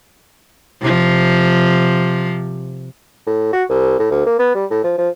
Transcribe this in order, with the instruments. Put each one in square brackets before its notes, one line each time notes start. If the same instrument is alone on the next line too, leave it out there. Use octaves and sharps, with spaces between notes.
[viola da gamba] C3 F3
[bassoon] A2
F#4
C2
A2
D2
A#3
B3
G3
A2
F3
F3